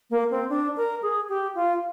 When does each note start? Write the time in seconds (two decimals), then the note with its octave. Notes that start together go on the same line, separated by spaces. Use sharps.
0.10 A#3
0.31 C4
0.50 D4
0.77 A#4
1.02 G#4
1.29 G4
1.55 F4